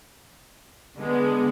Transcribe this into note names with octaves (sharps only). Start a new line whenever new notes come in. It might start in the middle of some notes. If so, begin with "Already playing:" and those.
D3 G#3 B3